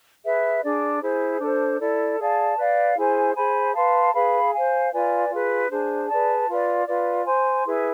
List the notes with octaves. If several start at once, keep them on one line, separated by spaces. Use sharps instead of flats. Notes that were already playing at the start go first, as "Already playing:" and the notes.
G#4 B4 E5
D4 G#4 D5
E4 G#4 C5
D4 A4 C5
E4 A4 D5
G#4 D5 F5 A5
B4 D5 F5
E4 G#4 C5 G#5
G#4 C5 G#5 B5
B4 F5 A5 C6
G#4 B4 F5 B5
C5 F5 G#5
F4 B4 D5 G#5
F4 G#4 B4
D4 G#4 C5
G#4 B4 D5 A5
F4 B4 D5
F4 B4 D5
C5 G#5 C6
E4 G#4 B4